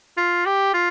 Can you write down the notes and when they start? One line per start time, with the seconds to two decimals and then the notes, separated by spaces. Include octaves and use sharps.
0.18 F4
0.46 G4
0.74 F4